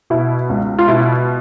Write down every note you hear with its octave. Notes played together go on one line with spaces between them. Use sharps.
B2 E4
C#2
F4
B2 E4